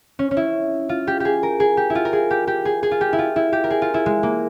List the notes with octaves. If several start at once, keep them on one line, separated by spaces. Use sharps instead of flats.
C#4
C#4
E4
F4
G4
G4 G#4
A#4
G#4
G4
E4
F4
A#4
G#4
G4
G4
G#4
G#4
F4
G4
E4
F4
E4
G4
A#4
G#4
F4
E4
G#3
A#3